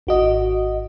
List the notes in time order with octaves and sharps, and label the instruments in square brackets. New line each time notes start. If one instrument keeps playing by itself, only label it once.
[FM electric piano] G#1 F#4 D#5